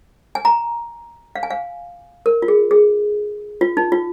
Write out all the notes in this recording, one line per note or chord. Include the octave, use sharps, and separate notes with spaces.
G#5
A#5
F5
G#5
F5
A#4
F4
G#4
G#4
F4
D#4
F4